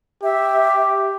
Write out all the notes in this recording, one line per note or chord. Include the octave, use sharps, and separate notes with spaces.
G4 E5